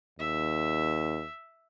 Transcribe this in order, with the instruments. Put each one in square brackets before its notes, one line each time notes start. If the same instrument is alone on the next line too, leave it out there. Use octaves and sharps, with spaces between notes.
[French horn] D#2 [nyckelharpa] E5